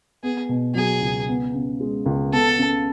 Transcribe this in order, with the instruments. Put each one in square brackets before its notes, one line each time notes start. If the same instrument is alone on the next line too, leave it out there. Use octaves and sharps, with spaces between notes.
[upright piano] B3 [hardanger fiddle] G#4
[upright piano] B2
[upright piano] F#3 [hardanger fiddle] G#4
[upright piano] C#2
B3
C#3
G#3
C#2
[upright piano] B3 [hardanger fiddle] A4
[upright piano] C#3